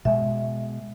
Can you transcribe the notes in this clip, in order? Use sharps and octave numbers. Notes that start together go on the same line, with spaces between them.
B2 G#3 E5